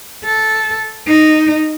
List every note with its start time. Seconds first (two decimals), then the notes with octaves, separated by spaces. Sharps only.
0.25 A4
1.08 D#4